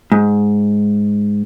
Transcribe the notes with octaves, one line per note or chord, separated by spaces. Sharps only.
G#2